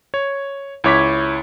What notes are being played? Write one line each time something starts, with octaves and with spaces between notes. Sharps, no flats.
C#5
C#2 E4 C#5 D6 G#6 B6